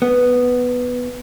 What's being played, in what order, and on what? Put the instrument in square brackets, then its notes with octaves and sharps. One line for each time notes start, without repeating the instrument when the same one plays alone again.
[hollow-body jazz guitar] B3